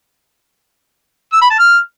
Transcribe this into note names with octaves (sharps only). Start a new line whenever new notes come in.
E6
B5
A5
F6